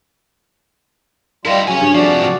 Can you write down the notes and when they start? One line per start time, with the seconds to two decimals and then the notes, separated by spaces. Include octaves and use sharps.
1.45 G3 E4 F4 A#4 D#5
1.67 C#3 F#3 C#4 G#5
1.80 G2
1.95 C3 F3 F#4 G#4 A4 D5
2.21 B2 F5